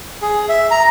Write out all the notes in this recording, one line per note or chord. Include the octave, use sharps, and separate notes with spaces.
G#4
E5
A#5